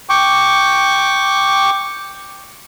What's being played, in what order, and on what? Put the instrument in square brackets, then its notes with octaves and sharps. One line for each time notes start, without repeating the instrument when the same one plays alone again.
[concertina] G5 C#6 D6